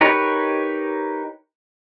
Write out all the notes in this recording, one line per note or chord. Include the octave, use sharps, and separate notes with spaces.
D#4 G4 A#4 B4 C#5